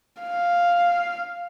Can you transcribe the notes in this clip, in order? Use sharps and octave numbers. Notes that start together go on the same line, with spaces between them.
F5